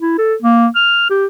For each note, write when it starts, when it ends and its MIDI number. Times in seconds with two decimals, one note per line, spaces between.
0.01 0.18 64
0.18 0.34 69
0.42 0.67 58
0.75 1.07 89
1.10 1.26 67